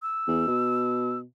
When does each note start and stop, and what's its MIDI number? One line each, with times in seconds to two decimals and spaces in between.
0.02 1.18 88
0.27 0.43 40
0.47 1.23 47